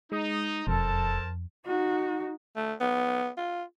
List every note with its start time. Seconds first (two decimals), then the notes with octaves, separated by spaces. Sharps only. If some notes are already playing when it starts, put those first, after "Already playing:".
0.12 G#3 D#4 D#6
0.67 E1 F2 A4 A#4 C5 A5
1.66 D#4 F#4
2.56 A3
2.80 B3
3.37 F4